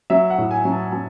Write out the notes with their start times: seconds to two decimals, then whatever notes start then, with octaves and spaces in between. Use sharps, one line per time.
0.10 F#3 E5
0.30 F#5
0.38 A2
0.51 G#5
0.65 F#3
0.72 A5
0.92 F#3 A5